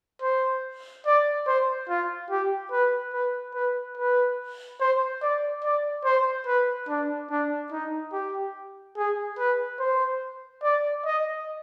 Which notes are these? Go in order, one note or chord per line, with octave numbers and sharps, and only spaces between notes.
C5
D5
C5
F4
G4
B4
B4
B4
B4
C5
D5
D5
C5
B4
D4
D4
D#4
G4
G#4
B4
C5
D5
D#5